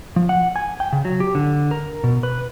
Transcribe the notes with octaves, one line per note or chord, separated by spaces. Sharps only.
F3
F#5
G#5
G5
C#3
F#3
G4
D3
A#4
B2
B4